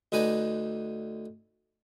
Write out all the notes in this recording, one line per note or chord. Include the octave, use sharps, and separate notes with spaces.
D2 D3 D#4 B4 G#5 A#5